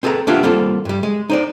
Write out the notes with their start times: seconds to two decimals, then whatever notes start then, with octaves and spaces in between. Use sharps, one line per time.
0.03 C4 G#4 A4 B4 A#5
0.27 A#3 B3 D4 E4 F4 G4
0.43 G3 A#3 C4 F4 A4
0.85 G2 G3
1.03 G#3
1.30 D#4 C5 D5